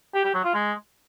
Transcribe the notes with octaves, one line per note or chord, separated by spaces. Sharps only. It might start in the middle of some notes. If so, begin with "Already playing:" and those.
G4
G4
F#3
F4
G#3